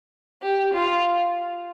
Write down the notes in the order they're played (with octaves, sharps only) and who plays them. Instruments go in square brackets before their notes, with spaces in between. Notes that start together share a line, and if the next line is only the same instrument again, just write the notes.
[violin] G4
F4